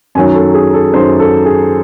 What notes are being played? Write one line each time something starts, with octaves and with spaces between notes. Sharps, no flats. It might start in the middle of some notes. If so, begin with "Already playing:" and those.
F#2 D#3 F#3 G#5
A4
G#4
A4
F#2 D#3 F#3 C5
A4
G#4